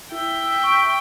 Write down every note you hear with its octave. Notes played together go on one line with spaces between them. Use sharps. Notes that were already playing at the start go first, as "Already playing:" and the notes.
E4 E5 G5
C#6 D7